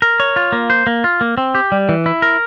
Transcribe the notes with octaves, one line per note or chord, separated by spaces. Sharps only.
A#4
C#5
F4
A#3
C5
A#3
F4
A#3
C4
G4
G3
E3
E4
A#4